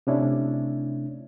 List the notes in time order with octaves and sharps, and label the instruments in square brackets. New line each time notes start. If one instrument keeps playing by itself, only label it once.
[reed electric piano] C3 A3 C#4 D4 E4